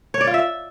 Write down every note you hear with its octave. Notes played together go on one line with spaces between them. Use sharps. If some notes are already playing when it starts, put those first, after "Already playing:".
C#5
D5
F4
E5